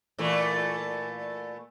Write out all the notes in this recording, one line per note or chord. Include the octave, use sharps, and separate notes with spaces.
A#2 E3 A3